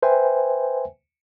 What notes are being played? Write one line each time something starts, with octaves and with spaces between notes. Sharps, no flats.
B4 C5 E5 G5 G#5